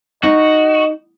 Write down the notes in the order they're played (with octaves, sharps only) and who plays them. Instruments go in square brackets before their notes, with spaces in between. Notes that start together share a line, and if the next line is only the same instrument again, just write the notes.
[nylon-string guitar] D#4 [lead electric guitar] F#4 [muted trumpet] D#5